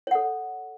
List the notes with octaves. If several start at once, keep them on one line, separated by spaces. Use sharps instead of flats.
A4 C#5 F#5